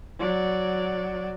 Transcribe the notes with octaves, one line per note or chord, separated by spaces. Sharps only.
F#3 D5